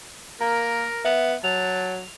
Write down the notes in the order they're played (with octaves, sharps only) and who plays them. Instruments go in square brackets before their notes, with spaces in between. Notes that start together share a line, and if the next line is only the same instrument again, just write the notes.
[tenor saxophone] A#3 [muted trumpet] A#4 [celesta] A#5
[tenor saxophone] B3 [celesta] E5
[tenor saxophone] F#3 [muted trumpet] A5 [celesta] F7